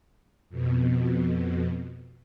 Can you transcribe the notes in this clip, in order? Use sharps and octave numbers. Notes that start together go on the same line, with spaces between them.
F2 B2